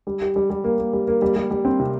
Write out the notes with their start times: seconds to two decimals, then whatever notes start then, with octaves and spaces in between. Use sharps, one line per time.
0.07 G3
0.22 G4
0.36 G3
0.50 G3
0.64 A#3
0.79 A#3
0.93 G3
1.08 A#3
1.22 G3
1.36 G3
1.51 G3
1.65 C4
1.80 C3